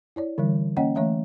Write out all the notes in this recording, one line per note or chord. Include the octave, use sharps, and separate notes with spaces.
E4 C#5 D5
D3 E3 G3
A#3 C#4 C#5 D#5 F#5 G5
E3 A3 C#5 E5 A#5